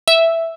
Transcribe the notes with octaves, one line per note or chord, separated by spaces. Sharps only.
E5